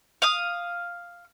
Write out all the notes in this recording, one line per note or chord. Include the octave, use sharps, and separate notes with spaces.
F5 D#6